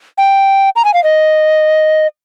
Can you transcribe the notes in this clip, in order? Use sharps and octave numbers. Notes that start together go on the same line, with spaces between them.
G5
A#5
G#5
F5
D#5